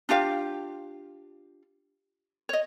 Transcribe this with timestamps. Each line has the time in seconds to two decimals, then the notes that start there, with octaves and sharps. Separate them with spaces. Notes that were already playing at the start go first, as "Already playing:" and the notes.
0.09 D4 F4 G4 F5
2.49 C#5 D#5